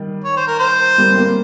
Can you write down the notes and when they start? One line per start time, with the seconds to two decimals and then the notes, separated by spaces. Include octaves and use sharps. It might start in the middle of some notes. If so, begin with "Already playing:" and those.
Already playing: D#3 G3
0.24 C#5
0.37 C5
0.47 A#4
0.59 C5
0.98 G3 A#3
1.12 C4
1.17 G3 A#3